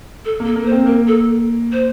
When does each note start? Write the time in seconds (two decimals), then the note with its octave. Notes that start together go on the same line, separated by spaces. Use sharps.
0.25 A4
0.40 A#3
0.45 A4
0.56 A#3
0.61 A#4
0.65 C5
0.71 C4
0.86 A#3 A#4
1.07 A4
1.72 C5